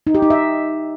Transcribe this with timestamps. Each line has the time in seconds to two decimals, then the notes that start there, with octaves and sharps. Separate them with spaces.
0.07 D#4
0.15 G4
0.22 D#4
0.30 E5